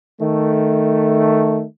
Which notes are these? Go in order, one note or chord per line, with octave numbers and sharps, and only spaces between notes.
D#3 A3